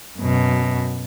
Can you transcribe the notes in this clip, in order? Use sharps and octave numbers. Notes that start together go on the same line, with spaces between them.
F#2 B2